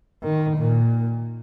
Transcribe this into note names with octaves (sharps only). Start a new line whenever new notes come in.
D#3
A#2